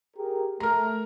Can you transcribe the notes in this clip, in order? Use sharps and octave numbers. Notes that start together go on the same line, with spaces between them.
G4 G#4 A#4
A3 A#4 A#5